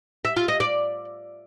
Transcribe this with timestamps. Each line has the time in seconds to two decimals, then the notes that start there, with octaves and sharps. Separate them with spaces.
0.25 E5
0.36 F4
0.48 D#5
0.60 D5